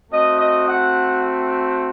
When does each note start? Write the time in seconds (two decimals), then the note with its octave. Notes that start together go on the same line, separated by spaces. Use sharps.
0.12 A3 C4 F#4 D#5
0.40 D#5
0.69 F#5